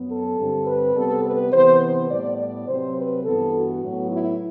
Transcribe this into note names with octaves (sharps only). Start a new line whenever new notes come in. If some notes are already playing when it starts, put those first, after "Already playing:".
Already playing: F#2 F#3 B3
A4
G2 D3 G3 C4
B4
C3 G3 B3 A4
B4
C3 E3 B3 C5
C5
A2 G3 B3 D5
D5
C3 F#3 C4 C5
B4
G2 E3 B3 A4
F#4
A2 F#3 B3
E4